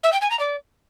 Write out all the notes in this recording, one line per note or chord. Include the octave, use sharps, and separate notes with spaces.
E5
G5
G#5
A#5
D5